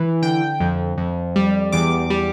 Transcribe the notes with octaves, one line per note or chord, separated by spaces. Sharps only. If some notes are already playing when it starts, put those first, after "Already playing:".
Already playing: E3
D3 G5
F2
F2
G3
E2 D6
G3